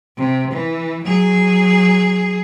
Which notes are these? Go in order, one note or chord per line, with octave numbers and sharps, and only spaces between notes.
C3
E3
F#3 G#4